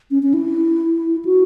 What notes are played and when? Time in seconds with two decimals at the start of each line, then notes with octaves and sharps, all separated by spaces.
0.11 C#4
0.23 C#4
0.34 E4
1.25 F#4